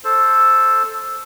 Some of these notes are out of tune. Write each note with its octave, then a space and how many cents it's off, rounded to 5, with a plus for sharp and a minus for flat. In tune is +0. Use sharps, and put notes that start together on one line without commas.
A4 +0 C5 +10